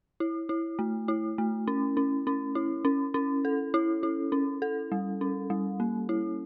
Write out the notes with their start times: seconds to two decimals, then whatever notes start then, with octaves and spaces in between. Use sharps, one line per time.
0.20 E4
0.49 E4
0.79 A3
1.08 E4
1.38 A3
1.67 C#4
1.97 C#4
2.27 C#4
2.55 E4
2.85 C#4
3.14 C#4
3.45 A4
3.74 E4
4.03 E4
4.32 C#4
4.62 A4
4.92 G3
5.21 C#4
5.50 G3
5.80 A#3
6.09 E4